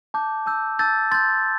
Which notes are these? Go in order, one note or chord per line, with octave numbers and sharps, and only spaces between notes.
A5 D6 G6
A5 E6 G6
A5 E6 G6 A6
C6 G6 A6